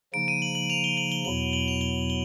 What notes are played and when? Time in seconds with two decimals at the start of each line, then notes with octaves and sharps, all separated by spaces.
0.14 C#3 F3 A#3 D#4 D7
0.28 D#7
0.42 F#7
0.55 F#7
0.70 F7
0.84 G7
0.97 F#7
1.12 G7
1.25 E2 B2 F#3 B3 E4 F#7
1.53 F#7
1.68 F7
1.81 G7
2.10 G7